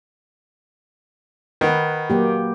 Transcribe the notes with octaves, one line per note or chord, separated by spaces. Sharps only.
D#3 B4 F#5
F#3 A#3 G4